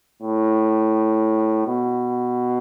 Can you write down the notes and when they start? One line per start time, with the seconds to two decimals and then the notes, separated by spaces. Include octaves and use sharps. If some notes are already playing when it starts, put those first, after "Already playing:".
0.22 A2
1.67 B2